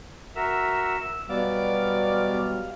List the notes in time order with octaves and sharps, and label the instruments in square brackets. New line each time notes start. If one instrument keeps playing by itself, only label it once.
[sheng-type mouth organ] F#4 A#4 E5 [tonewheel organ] E6
[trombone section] B2 F#3 G3 [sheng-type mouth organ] B3 D5 D6 [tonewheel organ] F5